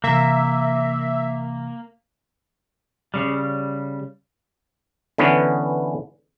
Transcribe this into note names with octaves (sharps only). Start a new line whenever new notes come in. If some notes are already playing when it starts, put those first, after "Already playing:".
C3 E3 A#3 E5
C#3 G3
D3 E3 B3 C#4